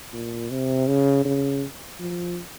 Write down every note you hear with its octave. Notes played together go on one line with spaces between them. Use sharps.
A#2
C3
C#3
C#3
F3